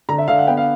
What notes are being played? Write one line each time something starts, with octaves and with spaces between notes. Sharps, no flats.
D3 A#5
E5
D3 F5
F#5
B3 G5
F5